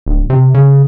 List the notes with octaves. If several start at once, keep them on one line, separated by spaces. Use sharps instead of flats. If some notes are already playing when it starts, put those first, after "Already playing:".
D1
C3
C#3